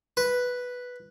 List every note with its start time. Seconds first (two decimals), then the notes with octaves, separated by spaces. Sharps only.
0.17 B4